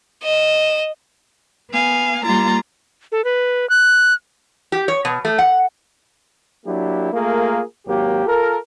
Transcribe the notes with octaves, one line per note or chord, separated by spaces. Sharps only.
D#5 E7
B3 F5 G#5
G3 A#3 F4 A#5 A6
A4
B4
F#6
G4
C#5
B2
A3
F#5
F#3 A#3 D4 E4 G4
A3 A#3 F4 G#4 A#4
G#1 F#3 A#3 G4
F4 A4 A#4